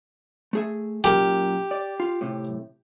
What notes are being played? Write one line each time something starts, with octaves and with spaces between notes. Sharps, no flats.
A3 G#4 E5
F#2 A#2 G4 A#4
D5
F4
A2 C3